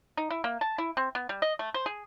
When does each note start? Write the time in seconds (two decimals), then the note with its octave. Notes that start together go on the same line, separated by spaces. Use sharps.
0.17 D#4
0.31 E4
0.44 A#3
0.61 A5
0.78 E4
0.97 C4
1.15 B3
1.29 G3
1.42 D#5
1.59 A3
1.74 C5
1.86 G#4